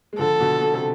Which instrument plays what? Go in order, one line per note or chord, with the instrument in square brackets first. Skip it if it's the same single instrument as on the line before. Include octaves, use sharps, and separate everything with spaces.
[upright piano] G#3
[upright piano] D3 F3 [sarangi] A4
[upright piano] B2 D3
B2
C3